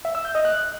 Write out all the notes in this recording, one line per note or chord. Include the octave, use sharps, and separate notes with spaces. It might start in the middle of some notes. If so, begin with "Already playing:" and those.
E5
E6
G6
D#5
F#6